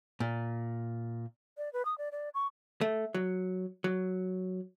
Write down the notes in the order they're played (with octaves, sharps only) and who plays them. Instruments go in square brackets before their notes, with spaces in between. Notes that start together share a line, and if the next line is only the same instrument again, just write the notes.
[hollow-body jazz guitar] A#2
[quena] D5
B4
D#6
D5
D5
C#6
[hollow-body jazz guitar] A3
F#3
F#3